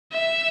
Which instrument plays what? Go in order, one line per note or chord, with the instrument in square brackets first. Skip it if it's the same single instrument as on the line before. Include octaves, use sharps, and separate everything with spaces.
[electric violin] E5